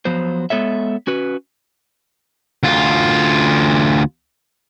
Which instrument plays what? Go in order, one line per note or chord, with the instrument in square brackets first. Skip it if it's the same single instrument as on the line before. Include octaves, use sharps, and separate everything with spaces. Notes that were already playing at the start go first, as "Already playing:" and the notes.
[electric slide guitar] F3 F#3 B3 C5
G#3 B3 A4 C#5 E5
C#4 F#4 B4
[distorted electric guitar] D2 F4